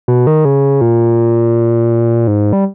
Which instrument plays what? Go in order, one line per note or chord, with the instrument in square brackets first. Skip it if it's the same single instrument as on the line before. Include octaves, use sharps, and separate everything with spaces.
[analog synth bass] B2
D#3
C#3
A#2
G#2
G3